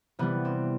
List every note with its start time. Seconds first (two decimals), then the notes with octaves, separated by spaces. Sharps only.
0.19 C3 E3 G3 B3
0.45 C4